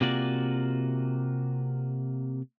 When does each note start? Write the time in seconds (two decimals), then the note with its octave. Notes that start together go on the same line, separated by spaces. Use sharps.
0.01 C3 A#3 F4 F#4 D5